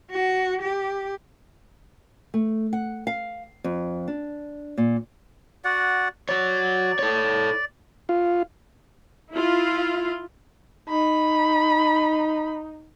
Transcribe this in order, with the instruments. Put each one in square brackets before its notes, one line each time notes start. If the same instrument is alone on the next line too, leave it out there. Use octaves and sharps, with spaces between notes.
[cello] F#4
G4
[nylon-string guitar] A3
F#5
F5
F2
D4
A#2
[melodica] F#4 D5 F#5
[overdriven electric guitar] F#4 C#5 [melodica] D5
[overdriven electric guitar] A4 C#5
[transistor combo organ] F4
[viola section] E4 F4
[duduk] D#4 [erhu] B5